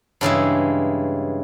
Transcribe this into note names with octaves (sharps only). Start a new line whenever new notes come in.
G2 C#3 E3 G#3